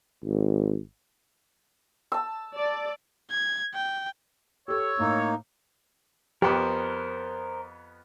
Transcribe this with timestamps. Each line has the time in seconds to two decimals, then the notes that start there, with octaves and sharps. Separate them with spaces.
0.25 G#1
2.12 A5 E6
2.55 D5
3.31 G#6
3.74 G5
4.68 G4 A4 C#5 E6
4.99 A2 A#3 D#4
6.42 F2 B3 G4 A#4 C5